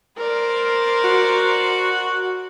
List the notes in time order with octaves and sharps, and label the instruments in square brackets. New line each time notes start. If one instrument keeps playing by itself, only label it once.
[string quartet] A#4 C5 D5
[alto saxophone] F#4